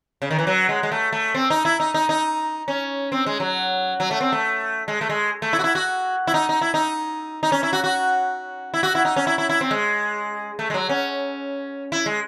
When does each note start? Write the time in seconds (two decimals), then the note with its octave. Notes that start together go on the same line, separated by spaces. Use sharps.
0.22 C#3
0.31 D#3
0.39 E3
0.47 F#3
0.69 G#3
0.83 G#3
0.92 A3
1.13 A3
1.35 C4
1.50 D#4
1.65 E4
1.80 D#4
1.94 D#4
2.09 D#4
2.68 C#4
3.12 C4
3.26 G#3
3.40 F#3
4.00 F#3
4.11 A3
4.21 C4
4.32 A3
4.88 G#3
5.01 A3
5.10 G#3
5.42 A3
5.53 E4
5.59 F#4
5.64 E4
5.75 F#4
6.27 E4
6.34 D#4
6.49 D#4
6.61 E4
6.74 D#4
7.43 D#4
7.52 C#4
7.63 E4
7.73 F#4
7.84 F#4
8.74 E4
8.83 F#4
8.95 E4
9.05 D#4
9.16 C#4
9.27 E4
9.38 E4
9.49 E4
9.61 C4
9.71 G#3
10.59 A3
10.70 G#3
10.74 F#3
10.89 C#4
11.92 E4
12.06 G#3